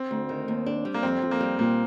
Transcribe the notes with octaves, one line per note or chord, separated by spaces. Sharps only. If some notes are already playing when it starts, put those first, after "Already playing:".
Already playing: C4
D2
D#3
D#2
D4
G3
A#3
F2 C4
F2
A#3
G3
A#2 A#3